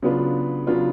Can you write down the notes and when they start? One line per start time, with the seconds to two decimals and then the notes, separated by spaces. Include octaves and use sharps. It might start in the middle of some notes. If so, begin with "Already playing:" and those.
0.02 C#3 F#3 B3 D4 F4
0.67 C#3 F#3 B3 D4 F4